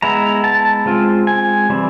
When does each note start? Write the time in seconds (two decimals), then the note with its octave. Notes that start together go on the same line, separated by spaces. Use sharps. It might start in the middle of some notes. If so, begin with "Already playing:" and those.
0.02 G#3 B3 E4 A#5
0.44 A5
0.86 G#3 C4 F4
1.27 G#5
1.70 E3 G3 C4